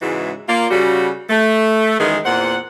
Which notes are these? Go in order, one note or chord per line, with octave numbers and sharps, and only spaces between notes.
G#2 C#3 E3 G#3 E4 F#4
A#3 F4 D5
C#3 G3 F#4
A3
F#2 D#3 E3 G#3 G#4
E2 A#2 C4 F#5